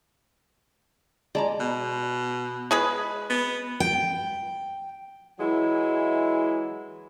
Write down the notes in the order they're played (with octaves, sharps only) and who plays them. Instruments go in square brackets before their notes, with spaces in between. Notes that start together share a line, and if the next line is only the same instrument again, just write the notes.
[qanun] G#3 [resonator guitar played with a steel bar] D5 A5 A#5
[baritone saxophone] B2
[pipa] G#3 G#4 B4
[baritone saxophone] B3
[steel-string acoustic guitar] G5
[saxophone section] E3 F#3 G#3 E4